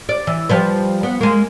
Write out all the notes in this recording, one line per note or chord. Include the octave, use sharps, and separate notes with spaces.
D5
E3
F3 G3 B4
B3
G#3 A#3